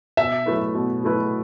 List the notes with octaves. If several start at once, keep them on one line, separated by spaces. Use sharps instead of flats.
B2 E5
F#3 A3 E4 B4
B2
F#3 A3 E4 B4